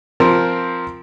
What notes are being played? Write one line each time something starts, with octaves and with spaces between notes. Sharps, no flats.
F3 C4 A#4